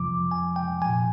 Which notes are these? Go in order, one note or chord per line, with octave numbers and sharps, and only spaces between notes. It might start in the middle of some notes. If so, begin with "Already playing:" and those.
Already playing: F2 C3 F3 D6
G#5
G5
A#2 F3 G#5